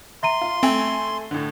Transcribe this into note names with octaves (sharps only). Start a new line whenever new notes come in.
E5 A#5 C6 D#7
F4
A3 C4 G#5 F#7
A2 D3